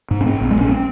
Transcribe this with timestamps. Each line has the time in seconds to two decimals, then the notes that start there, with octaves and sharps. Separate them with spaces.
0.11 G#2
0.21 C#4
0.26 G#2 C4
0.41 A#1
0.51 G#3
0.56 A#1 C#4
0.71 C4